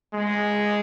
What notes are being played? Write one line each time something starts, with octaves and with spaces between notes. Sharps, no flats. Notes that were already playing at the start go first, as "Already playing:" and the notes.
G#3